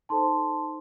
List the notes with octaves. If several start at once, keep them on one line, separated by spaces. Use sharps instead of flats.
D#4 A4 C5 A5 C6